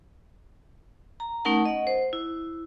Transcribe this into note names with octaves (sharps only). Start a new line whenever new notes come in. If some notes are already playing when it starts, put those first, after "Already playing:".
A#5
A3 C#4 D#4 A#4 F#5 A5
D#5 F#5
C5
E4